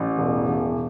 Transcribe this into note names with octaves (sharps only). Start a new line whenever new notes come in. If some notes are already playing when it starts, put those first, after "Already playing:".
Already playing: A1
E1
E1